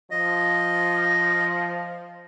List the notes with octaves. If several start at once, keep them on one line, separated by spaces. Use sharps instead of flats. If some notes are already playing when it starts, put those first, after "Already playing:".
F3 D#5